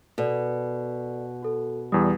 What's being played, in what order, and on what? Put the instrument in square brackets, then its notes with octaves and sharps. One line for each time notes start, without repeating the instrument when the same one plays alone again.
[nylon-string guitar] B2 [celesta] A4 D5
[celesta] F#4 A4
[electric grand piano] E2 G3 [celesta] D#6